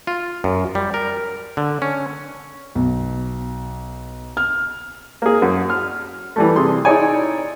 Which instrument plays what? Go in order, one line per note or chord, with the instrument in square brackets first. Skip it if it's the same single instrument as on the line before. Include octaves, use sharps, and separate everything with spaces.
[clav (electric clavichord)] F4
F#2
G3
A#4
D3
C#4
[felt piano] B1
F6
[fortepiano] A#3 G#4
F#2
F6
E3 G3 A3
C3 G#4 C6
D#4 E4 G#4 C#5 D5 G#5